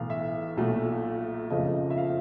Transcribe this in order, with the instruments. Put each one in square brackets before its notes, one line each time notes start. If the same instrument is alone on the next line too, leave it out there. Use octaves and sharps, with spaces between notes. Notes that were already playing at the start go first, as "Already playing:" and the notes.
Already playing: [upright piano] B1 A2 E3 F5
E5
B1 A#2 F#3 A3
F#1 F2 C#3 F3 A3 D#5
E5
F5